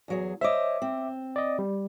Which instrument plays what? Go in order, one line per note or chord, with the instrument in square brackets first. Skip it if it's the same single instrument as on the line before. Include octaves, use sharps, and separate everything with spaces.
[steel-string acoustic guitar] E2 F#3 G#4
[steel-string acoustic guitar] C5 C#5 D#5 [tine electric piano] E5 D6
[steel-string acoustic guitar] C4
[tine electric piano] D5 D#5
G3